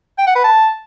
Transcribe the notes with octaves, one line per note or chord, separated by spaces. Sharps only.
G5
F#5
B4
A5